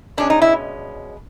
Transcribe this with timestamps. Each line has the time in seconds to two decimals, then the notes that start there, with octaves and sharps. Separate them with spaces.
0.17 B2 G#3 C#4 D4
0.30 D#4
0.42 E4